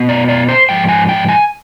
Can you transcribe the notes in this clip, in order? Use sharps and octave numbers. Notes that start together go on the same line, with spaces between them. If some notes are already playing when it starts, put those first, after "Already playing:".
Already playing: B2 B3
D5
D5
C5
G#2 F3 G5
G#5
G5
G#5